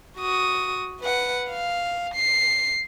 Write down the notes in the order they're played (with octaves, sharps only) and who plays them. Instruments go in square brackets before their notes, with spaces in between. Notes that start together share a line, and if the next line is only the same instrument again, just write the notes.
[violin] F#4 D#6
B4 F#5
F5
C7